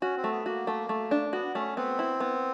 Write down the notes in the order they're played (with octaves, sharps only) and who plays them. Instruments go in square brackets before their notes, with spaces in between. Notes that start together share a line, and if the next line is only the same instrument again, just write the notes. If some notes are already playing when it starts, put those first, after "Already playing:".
[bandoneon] C#4 [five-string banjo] F#4
[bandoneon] C4
[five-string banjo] A3
[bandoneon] B3
[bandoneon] A#3 [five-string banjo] F#4
[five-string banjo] A3
A3
D4
[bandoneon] B3 [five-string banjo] F#4
[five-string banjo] A3 [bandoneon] C#4
[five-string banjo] B3 [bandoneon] C4
[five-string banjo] E4
B3